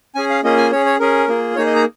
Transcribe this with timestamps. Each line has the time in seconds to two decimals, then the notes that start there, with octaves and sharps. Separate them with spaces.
0.15 C#4 G#4 G#5
0.30 F5
0.43 A#3 C#4 F4 G#4 D#5
0.57 G#5
0.71 C#4 G#4 C#5
0.86 C#5
0.99 C#4 G#4 A#4
1.28 A#3 F4 G#4
1.56 A#3 D#4 G#4 C#5
1.67 D#5
1.76 A#5